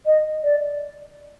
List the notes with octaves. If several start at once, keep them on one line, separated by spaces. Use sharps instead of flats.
D#5
D5